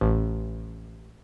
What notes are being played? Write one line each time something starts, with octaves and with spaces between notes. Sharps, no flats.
A1